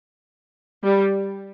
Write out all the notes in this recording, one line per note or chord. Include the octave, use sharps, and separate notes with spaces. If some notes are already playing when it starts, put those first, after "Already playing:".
G3